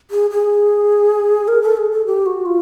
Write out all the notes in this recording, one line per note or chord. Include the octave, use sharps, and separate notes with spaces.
G#4
G#4
A#4
A4
G#4
A4
G4
F#4
F4